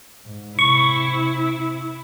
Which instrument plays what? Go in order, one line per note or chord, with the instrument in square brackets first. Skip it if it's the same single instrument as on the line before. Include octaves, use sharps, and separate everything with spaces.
[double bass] G#2
[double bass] C3 [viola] E4 [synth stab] C#6